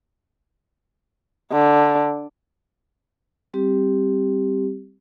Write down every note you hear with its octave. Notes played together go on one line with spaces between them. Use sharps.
D3
G3 C4 G4